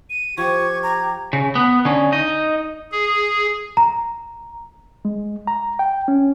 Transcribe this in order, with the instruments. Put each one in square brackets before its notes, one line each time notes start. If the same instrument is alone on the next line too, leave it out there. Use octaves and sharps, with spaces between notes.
[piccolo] D#7
[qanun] F3 [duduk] G4 [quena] C#6 [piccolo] G#6
[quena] A#5
[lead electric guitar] C#3
B3
D3 C#4
D#4 D#5
[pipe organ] G#4
[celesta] A#5
[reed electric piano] G#3
A#5
G5
C#4